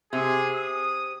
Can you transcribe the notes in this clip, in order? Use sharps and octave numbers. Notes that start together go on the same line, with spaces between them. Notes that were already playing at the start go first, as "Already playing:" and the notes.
C3 G#4
D#6